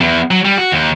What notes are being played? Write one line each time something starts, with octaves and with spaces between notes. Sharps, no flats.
E2
F#3
G3
F#4
D#2